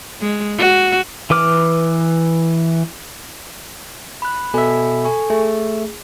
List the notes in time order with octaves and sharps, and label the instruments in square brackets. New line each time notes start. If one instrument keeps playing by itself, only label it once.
[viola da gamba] G#3
F#4
[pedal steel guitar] E3 B4 D6 F6
[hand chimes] B5 F#6
[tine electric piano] B2 E5 [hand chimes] A4 G#5 B5
[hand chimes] A4 G#5 C#6
[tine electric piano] A3 [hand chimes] G#4